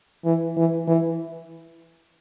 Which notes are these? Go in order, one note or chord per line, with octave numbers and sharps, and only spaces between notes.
E3
E3
E3